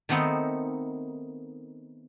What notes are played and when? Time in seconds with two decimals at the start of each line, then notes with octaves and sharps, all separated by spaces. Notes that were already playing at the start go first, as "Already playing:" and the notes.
0.09 D#3 A3 B3 C4 D#4